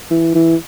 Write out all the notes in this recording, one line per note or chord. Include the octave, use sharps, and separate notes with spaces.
E3
E3